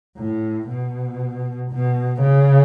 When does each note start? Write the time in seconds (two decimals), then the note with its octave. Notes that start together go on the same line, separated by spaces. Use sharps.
0.18 A2
0.68 B2
1.71 B2
2.22 C#3